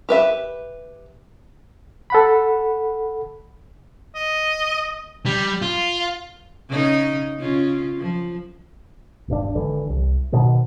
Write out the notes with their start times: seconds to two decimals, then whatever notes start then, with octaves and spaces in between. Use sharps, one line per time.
0.09 G4 B4 E5
2.10 A4 F#5 B5
4.15 D#5
5.26 G3
5.62 F4
6.69 C#3 C#4 D#4
7.39 C#3 C#4 F4
7.98 F3
9.28 D#1 G#1 G2 D4
9.55 G#1 D3 E3
9.89 C2
10.32 G#2 B2 D#3